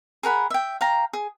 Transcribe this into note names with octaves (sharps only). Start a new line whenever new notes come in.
G#4 A#4 F#5 B5
E5 G5
F5 G5 A#5
G#4